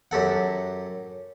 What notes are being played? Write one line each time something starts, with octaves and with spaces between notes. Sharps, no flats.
F#2 G4 A4 F#5